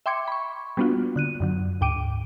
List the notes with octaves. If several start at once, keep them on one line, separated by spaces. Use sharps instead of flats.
E5 G5 C6 D6 G#6 C#7
B5 C#6
G3 A#3 B3 D4 F4 F#4
D3 F#6 D#7
F#2 D3 F#3
D2 G#2 G5 D6 D7 D#7